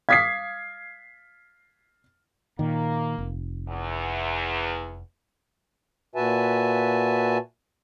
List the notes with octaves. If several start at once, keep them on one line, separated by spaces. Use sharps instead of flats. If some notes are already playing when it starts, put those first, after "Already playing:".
F5 D6 D#6 G#6 B6 C7
A#2 D#3 A#3
F1
E2
A#2 F#4 B4 E5 G#5 A5